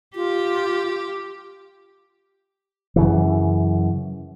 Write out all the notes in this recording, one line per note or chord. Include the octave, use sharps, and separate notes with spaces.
F4 G4
F#2 C#3 E3